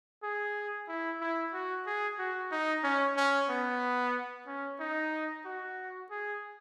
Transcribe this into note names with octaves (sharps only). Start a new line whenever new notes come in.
G#4
E4
E4
F#4
G#4
F#4
D#4
C#4
C#4
B3
C#4
D#4
F#4
G#4